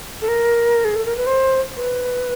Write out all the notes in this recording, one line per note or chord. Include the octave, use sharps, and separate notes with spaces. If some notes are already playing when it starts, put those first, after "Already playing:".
A4
A#4
G#4
A4
A#4
B4
C5
B4